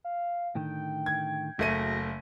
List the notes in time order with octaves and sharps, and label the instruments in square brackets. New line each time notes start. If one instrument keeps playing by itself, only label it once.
[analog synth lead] F5
[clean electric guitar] A2 D3 D#3 [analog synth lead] G5
[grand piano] G#6
[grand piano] F#1 A3 D#7 [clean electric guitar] F#4 G#4 [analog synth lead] A#6